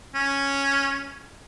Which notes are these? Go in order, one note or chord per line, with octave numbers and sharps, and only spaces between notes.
C#4